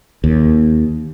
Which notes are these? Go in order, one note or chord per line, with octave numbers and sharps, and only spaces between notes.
D#2